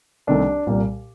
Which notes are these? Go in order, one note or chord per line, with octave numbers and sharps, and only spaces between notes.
C2 C3 D#3 A3 C4 D4
C2 A#2 G3 A#3